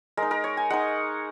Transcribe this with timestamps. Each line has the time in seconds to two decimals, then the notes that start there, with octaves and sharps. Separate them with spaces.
0.17 G#3 D#4 A#4
0.31 A#4
0.44 C#5
0.57 G#5
0.70 G#3 D#4 F#5